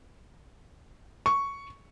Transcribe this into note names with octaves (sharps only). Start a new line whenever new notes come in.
C#6